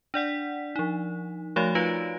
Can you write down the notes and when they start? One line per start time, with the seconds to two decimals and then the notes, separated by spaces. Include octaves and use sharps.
0.14 D4 D5 F#5 B6
0.76 F3 D#4
1.56 F3 A3 F#4 C#5 D5 F5
1.75 D#4 F4 B4 F5 A#6 D7